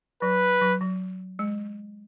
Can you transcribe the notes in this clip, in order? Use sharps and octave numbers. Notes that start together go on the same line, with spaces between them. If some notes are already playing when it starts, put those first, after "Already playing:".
F#3 B4
F#3
F#3
G#3